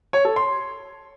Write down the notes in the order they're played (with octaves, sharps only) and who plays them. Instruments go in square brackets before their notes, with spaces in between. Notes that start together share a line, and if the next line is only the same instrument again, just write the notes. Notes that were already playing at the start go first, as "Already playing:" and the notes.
[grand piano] C#5
A4
C6